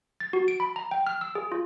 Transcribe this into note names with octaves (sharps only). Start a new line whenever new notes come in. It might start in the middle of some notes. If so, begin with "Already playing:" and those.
A6
F#4
D7
B5
A#5
G5
F6
E6
G#4
F4